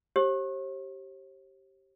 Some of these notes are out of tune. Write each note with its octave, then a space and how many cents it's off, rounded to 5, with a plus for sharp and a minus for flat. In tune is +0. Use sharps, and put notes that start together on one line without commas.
G4 -20 C5 +45